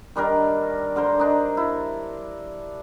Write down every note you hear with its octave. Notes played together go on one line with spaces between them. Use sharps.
D#3 G3 D4 A#4
D3 A#4 C5
D4 D#4
E4